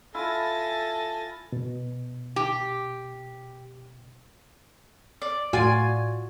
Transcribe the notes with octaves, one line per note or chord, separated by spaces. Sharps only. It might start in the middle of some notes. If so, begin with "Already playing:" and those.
E4 F4 A4 G#5 A6 A#6
B2
G4
D5
A2 F4 F#4 D5 G#5